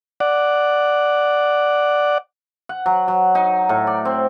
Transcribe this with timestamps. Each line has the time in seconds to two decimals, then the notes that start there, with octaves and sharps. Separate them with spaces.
0.20 D5 F#5
2.69 F#5
2.86 F#3
3.08 F#3
3.35 D#4
3.69 A2
3.87 D5
4.05 C4